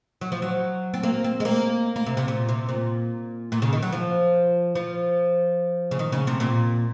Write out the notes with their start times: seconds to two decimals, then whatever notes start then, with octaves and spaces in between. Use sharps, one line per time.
0.21 F#3
0.32 F3
0.42 F#3
0.94 C4
1.03 A#3
1.24 C4
1.40 G#3
1.45 A#3
1.96 A#3
2.06 C3
2.17 C3
2.28 A#2
2.49 C3
2.69 A#2
3.52 A#2
3.62 C#3
3.73 D#3
3.82 F#3
3.92 F3
4.75 F3
5.91 C#3
5.99 D#3
6.12 C#3
6.27 C3
6.40 A#2